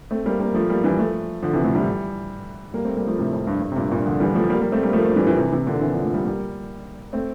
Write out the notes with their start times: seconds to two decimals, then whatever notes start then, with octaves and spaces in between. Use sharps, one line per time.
0.11 A3 C4
0.26 G3 A#3
0.40 G3 A#3
0.54 F3 A3
0.70 G3 A#3
0.83 E3 G3
0.99 F3 A3
1.42 D3 F3
1.53 C3 E3
1.64 A2 C3
1.75 E3 G3
2.74 G3 A#3
2.85 A3 C4
2.97 G3 A#3
3.07 F3 A3
3.19 A2 C3
3.33 F2
3.47 G2
3.61 G2
3.72 C3
3.76 G2 A#2
3.91 G2 A#2
4.06 D3 F3
4.20 E3 G3
4.35 F3 A3
4.50 G3 A#3
4.60 G3 A#3
4.72 A3 C4
4.83 G3 A#3
4.93 F3 A3
4.99 A#3
5.04 F3 A3
5.16 E3 G3
5.27 E3 G3
5.37 C3 E3
5.52 C3 E3
5.66 A#2 D3
5.81 C3 E3
5.92 D3 F3
6.03 F3 A3
6.14 G3 A#3
6.25 G3 A#3
7.13 A3 C4